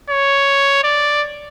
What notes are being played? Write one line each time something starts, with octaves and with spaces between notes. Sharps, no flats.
C#5
D5